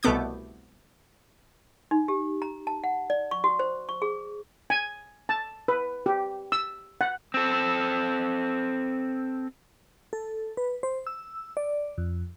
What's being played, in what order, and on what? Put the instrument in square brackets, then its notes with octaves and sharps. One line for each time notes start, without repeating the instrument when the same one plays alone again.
[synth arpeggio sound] C2 B2 A3 B3 D6 G6
[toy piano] D#4
G4
A#5
A5
F#5
D5
C#6
F#4
C5
C#6
G#4
[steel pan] G#5
A5
B4
G4
E6
F#5
[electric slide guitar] C4 A4
[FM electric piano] A4
B4
C5
E6
D5
F2